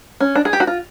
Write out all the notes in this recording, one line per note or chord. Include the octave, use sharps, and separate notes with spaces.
C#4
D4
G#4
G4
F#4
F4